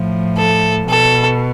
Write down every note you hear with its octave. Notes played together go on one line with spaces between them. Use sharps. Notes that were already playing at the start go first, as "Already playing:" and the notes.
Already playing: A2 F3
A4
B2 A4